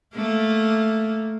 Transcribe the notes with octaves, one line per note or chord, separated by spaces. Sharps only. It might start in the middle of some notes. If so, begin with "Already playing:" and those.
A3 A#3